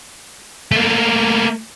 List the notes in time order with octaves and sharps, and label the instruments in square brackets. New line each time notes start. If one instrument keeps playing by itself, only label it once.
[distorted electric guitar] A3 A#3